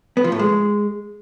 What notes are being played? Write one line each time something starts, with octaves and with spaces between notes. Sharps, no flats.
B3
F3
A2
G#3